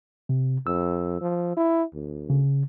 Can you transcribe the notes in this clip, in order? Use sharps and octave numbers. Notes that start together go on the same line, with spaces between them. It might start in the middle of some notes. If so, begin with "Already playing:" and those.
C3
F2 E6
F3
E4
D2
C#3